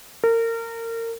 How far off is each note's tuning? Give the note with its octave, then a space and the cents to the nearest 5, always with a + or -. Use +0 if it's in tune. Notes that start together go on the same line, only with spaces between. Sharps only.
A#4 -30